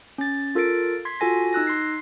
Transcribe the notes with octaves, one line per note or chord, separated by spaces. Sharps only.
C#4 A6
F4 A4 A#4 A6 D7
C6 G#6 B6
F4 F#4 A4 G#5 A#6
D#4 E6 F#6 A#6
C6 C7